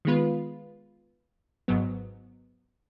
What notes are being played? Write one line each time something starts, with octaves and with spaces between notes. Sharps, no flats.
D#3 G#3 B3 F4 B4
G#1 G#2 F#3 B3